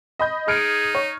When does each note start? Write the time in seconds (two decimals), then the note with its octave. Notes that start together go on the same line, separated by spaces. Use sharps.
0.19 D#5 B5 G6
0.48 D#4 G#4 F6 C#7 D7
0.95 C#5